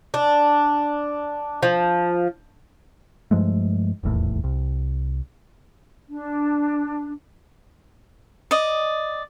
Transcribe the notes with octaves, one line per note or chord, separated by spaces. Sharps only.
D4
F3
G2 F3 G#3 A3
D#1 A#1 E2 A2
C2
D4
D5 D#5